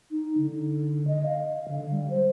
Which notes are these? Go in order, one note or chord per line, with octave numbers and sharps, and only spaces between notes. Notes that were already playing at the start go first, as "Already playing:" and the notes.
D#4
D3
D#5
F5
D3
G3
C5